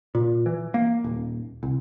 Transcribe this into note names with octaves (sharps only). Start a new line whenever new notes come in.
A#2
E3
A#3
D#1
C2